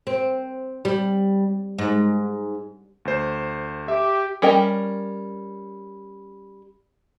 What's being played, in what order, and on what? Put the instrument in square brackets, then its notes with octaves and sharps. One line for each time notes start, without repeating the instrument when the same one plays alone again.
[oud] C4
G3
G#2
[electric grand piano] D2 C5
[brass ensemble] G4 [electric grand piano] E5
[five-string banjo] G3 C#4 A#4 D#5 G5